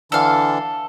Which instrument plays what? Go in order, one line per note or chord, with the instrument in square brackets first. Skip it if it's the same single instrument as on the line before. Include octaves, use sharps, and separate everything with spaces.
[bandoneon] D3 E3 D4 [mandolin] A4 F5